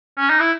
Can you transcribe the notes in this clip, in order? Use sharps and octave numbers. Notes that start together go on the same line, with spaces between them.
C#4
D#4
E4